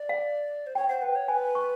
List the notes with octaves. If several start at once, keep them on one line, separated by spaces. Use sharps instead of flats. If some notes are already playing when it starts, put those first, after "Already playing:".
Already playing: D5
F5
C5
C#5 G5
C5 F#5
B4 G5
C#5
B4 G#5
C#6